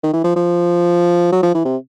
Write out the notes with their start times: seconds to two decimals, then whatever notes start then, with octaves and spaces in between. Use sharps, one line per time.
0.04 D#3
0.13 E3
0.24 F3
0.36 F3
1.32 F#3
1.43 F3
1.55 E3
1.65 C3